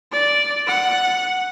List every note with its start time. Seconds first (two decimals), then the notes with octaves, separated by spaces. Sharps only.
0.12 D5
0.67 F#5